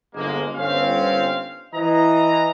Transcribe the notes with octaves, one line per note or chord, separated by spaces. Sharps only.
G1 G#3 A#3
G1 C4 C#4 F5
E3 D#5 A#5